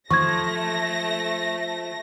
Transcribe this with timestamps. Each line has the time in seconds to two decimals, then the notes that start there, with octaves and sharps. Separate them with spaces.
0.10 F3 A3 C#6 G#6 A#6